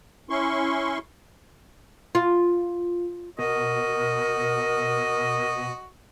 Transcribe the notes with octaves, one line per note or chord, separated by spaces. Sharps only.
C#4 E4 C6 C#6
F4
B2 F#4 A#4 D#5